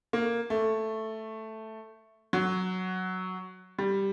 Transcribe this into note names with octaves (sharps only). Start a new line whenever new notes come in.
A#3
A3
F#3
G3